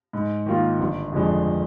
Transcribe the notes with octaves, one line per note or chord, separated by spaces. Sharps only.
G#2
D#3 A#3 F4
G1
F2 D3 G#3